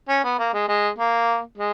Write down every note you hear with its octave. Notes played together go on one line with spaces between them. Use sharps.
C#4
B3
A#3
G#3
G#3
A#3
G#3